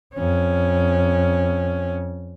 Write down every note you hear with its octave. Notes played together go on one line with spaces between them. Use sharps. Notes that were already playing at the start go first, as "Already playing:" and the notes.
F2 C#4